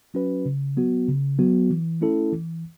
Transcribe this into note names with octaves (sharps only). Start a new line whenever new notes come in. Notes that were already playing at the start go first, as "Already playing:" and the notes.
F#3 C#4 F#4 B4
C#3
F#3 B3 F#4
C#3
F#3 B3 F#4
E3
A3 C#4 E4 A4
E3